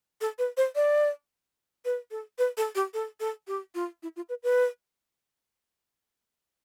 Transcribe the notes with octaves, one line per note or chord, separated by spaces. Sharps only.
A4
B4
C5
D5
B4
A4
B4
A4
G4
A4
A4
G4
F4
E4
F4
B4
B4